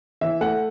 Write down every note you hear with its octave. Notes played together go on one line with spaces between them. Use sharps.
E3 E5
A3 F#5